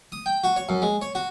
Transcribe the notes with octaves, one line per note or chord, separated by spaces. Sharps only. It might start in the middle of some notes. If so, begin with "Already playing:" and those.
D#6
G5
F#4
C#5
F#2
G#3
C#5
F#4